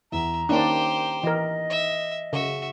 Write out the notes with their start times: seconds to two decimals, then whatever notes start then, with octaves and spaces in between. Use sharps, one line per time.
0.12 E2 E5 A#5
0.49 D#3 A#3 C#4 D4 G4 C5
1.23 E3 A#4 D#5
1.70 E5
2.33 C#3 F#4 E5